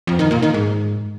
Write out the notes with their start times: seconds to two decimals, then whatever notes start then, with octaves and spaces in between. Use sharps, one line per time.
0.07 F2
0.19 D#3
0.31 A#2
0.42 D#3
0.54 G#2